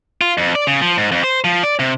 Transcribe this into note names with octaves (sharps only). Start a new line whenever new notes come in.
F4
F2
D5
C#3
F3
G#2
F2
C5
F3
D5
C3